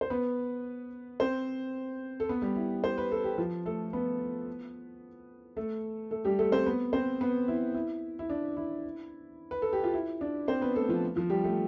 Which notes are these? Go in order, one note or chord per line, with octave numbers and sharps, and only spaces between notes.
C5
B3 B4
C4 C5
A4
B3 B4
G3 G4
E4
C5
B4
A4
G4
F3 F4
A3 A4
B3 B4
A3 A4
A3 A4
G3 G4
A3 A4
C4 C5
B3 B4
C4 C5
B3 B4
E4
E4
E4
D4
E4
B4
A4
G4
F4
E4
D4
C4 C5
B3 B4
A3 A4
F3 F4
F3 F4
G3 G4
A3 A4